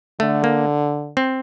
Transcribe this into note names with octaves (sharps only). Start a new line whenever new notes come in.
D3 A3
A#3
C4